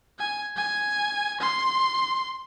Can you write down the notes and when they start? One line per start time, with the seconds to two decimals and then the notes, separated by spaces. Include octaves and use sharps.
0.19 G#5
0.57 G#5
1.40 C6